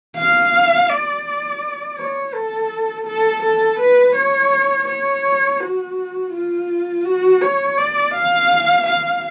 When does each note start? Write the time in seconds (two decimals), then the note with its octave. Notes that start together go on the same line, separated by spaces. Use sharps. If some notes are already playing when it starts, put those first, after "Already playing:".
0.17 F5
0.89 D5
1.98 C#5
2.34 A4
3.07 A4
3.43 A4
3.80 B4
4.15 C#5
4.88 C#5
5.60 F#4
6.33 F4
7.05 F#4
7.42 C#5
7.78 D5
8.14 F5
8.86 F5